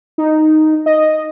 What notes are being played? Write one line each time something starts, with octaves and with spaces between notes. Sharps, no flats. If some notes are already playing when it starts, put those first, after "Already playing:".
D#4
D#5